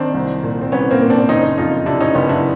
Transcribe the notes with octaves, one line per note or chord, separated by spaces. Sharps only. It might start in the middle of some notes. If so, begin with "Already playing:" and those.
Already playing: D#3 C4 D4
C2
A#2
C4
C2 B3 C#4
A#3 C4
A#2
C4 D4
F#1 C#4 D#4
F2 D#4 F4
C3 D4 E4
C#4 D#4
F#1 B3 C#4
D4 E4